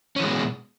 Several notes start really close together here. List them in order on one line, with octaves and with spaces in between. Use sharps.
C#4 E3 G#3 B2